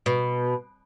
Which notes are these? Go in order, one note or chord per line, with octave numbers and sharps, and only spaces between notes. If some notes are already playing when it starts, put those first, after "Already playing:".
B2